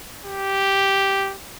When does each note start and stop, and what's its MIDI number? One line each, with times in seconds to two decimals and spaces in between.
0.25 1.36 67